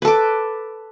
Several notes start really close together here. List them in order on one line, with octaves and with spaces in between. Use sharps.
B4 A4 D6